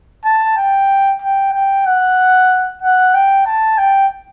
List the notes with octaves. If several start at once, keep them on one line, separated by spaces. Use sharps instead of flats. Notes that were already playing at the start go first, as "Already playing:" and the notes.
A5
G5
G5
G5
F#5
F#5
G5
A5
G5